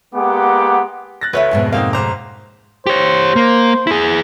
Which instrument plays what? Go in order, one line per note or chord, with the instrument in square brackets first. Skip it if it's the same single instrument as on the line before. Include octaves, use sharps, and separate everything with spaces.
[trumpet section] G#3 A#3 B3 G4 F#5 D6
[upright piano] F#6 A6 A#6
[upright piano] D2 A3 [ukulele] B4 C#5 E5
[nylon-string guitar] F2 G#2 B2
[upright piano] A#3 C4 D#4 [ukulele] F5
[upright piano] G1 C5 D6 [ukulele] A#5
[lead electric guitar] G4 C#5 [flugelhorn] C5
[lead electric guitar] A#3
E4 G#4